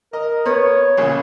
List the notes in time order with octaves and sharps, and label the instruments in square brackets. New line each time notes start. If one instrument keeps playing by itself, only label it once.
[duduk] A#4 [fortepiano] D#5
[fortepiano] B3 [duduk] C#5
[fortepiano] A#1 C#3